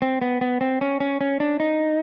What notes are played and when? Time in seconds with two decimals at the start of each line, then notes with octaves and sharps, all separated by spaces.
0.02 C4
0.22 B3
0.41 B3
0.61 C4
0.81 C#4
1.00 C#4
1.21 C#4
1.40 D4
1.60 D#4